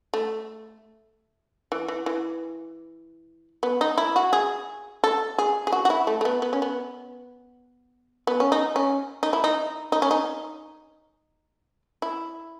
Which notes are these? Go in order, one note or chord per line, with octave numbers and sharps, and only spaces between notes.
A3
E3
E3
E3
B3
D#4
E4
F#4
G#4
A4
G#4
G#4
F#4
F#4
E4
A3
A3
B3
B3
C#4
B3
B3
C#4
D#4
C#4
D#4
E4
D#4
D#4
C#4
D#4
E4